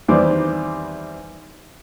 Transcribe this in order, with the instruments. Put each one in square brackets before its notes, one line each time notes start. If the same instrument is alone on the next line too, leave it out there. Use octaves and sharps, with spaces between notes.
[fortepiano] E2 D#3 G3 B3 C4 D6